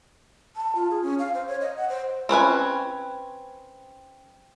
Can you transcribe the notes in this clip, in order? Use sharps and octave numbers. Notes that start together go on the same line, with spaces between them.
A5
F4
G#4
C#4
F5
C5
C#5
D#5
F#5
C5
C4 C#4 B4 G#5